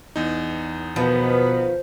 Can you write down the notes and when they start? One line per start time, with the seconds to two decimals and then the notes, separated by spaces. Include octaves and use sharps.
0.16 E2 D#4
0.96 B2 D#3 F3 B3